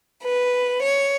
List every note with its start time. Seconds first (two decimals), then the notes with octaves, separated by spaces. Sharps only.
0.24 B4
0.83 C#5